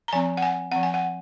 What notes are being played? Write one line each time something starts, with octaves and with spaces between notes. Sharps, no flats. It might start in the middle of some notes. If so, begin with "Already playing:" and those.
A#5
F3 C4 G#5
F#5
G#5
F3 C4 F#5
G#5
F#5